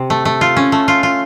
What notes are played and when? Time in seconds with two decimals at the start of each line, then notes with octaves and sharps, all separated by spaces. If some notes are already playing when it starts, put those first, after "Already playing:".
Already playing: C3
0.10 A3
0.25 A3
0.41 F4
0.57 C#4
0.72 A3
0.88 F4
1.03 F4